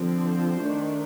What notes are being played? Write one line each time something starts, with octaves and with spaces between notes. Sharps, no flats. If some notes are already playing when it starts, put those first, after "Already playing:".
Already playing: D3 F3 C4
C5
D#3 A3 D4